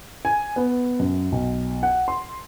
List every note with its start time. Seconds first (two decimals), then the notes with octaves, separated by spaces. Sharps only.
0.25 G#5
0.56 B3
0.99 F#2
1.32 B1
1.83 F#5
2.08 C6